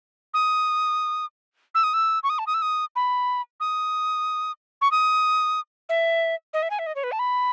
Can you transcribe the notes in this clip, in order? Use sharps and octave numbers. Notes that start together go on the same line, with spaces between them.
D#6
E6
D#6
E6
C#6
D#6
A5
D#6
E6
D#6
B5
D#6
C#6
D#6
E5
D#5
E5
G#5
E5
D#5
C#5
B4
A5
B5